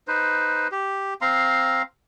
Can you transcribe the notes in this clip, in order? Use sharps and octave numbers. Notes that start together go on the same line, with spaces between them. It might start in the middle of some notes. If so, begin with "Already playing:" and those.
D#4 B4 C5
G4
C4 F5 A#5 C6